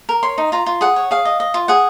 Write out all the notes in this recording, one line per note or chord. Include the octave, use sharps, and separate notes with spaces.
A#4
C#5 C6
D#4
F4 A#5
F4
G#4 F#5
C#5
G#4 F5
D#5
D#5
F4
G#4 F#5